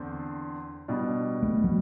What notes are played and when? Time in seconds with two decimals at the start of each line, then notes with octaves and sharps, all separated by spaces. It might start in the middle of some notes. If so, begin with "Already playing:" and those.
Already playing: E2 D3 C4
0.88 B2 G3 D4
1.43 A3
1.64 F#3